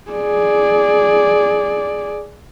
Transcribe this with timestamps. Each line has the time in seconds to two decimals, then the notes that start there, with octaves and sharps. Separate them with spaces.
0.11 G#4 D5